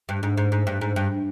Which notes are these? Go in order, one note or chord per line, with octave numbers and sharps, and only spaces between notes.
G2
G#2
G#2
G#2
G2
G#2
G2